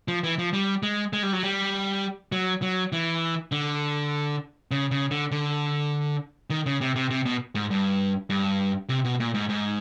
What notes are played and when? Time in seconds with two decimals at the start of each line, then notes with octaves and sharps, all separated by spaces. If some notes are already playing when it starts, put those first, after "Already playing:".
0.08 F3
0.23 E3
0.38 F3
0.53 G3
0.83 G#3
1.13 G#3
1.23 G3
1.33 F#3
1.43 G3
2.32 F#3
2.62 F#3
2.92 E3
3.52 D3
4.71 C#3
4.91 C#3
5.11 D3
5.32 D3
6.50 D#3
6.66 C#3
6.81 C3
6.96 C3
7.10 C3
7.25 B2
7.55 G#2
7.70 G2
8.30 G2
8.89 C3
9.05 B2
9.20 A#2
9.34 G#2
9.49 G#2